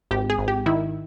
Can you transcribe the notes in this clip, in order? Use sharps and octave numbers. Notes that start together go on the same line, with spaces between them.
G#1 G4
G#4
G#1
G4
D#3 E4